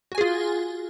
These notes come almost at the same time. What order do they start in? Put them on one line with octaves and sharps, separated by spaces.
F#4 G#5 G#4 F4